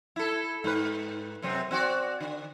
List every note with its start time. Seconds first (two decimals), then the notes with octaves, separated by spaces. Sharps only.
0.16 E4 A4
0.64 G#2 B4
1.42 F#2 C3 C4
1.71 C4 F#4 D5
2.20 D3